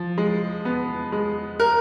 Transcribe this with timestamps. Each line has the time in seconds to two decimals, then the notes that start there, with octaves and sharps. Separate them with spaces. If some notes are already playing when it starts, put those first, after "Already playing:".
Already playing: F3
0.18 G#3
0.65 B3
1.12 G#3
1.60 A#4